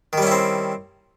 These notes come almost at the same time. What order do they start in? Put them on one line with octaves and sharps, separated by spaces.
D#3 G3 C#4 E4 C4